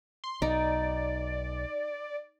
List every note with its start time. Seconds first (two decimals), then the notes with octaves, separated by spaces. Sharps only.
0.24 C6
0.42 B1 D#4 D5